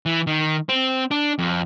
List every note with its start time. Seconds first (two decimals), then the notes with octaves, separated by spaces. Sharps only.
0.06 E3
0.27 D#3
0.69 C4
1.11 D4
1.38 F2